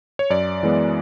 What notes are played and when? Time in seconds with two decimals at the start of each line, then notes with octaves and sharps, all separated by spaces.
0.19 C#5
0.30 F#2 D5
0.63 E3 G#3 B3